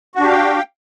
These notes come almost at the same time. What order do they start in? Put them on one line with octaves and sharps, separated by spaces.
F#4 D4 G4 F5 G5